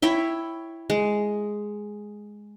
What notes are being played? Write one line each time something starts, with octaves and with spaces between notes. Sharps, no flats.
E4 C#5 E5 G5
G#3